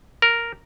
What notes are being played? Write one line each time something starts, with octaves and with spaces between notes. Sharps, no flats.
A#4